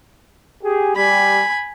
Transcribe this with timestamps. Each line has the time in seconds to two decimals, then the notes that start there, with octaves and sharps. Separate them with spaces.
0.63 G4 G#4
0.96 G3 G4 G#5 B5